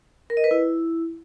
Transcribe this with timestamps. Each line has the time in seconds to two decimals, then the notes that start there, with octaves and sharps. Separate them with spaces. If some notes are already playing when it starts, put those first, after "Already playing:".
0.30 A#4
0.37 D#5
0.44 B4
0.51 E4